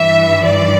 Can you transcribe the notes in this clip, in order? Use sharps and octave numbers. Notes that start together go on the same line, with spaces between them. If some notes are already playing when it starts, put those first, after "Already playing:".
Already playing: G2 E3 E5
D5